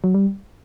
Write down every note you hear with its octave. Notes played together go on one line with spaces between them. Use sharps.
F#3
G3